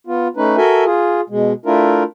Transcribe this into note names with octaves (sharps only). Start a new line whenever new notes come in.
B3 F4
A3 C#4 D#4 B4
F#4 A4 A#4 E5 G#5
F4 G#4
B2 G#3
A3 D4 E4 F4 A#4